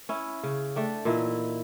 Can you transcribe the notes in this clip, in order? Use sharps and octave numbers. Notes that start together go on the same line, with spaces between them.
C#4 E4
C#3
A3 D4 G5
A#2 E3 D#4 E4